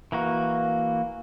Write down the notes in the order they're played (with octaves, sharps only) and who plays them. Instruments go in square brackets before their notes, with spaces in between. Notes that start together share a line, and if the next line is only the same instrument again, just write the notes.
[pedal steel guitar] E3 A#3 F#4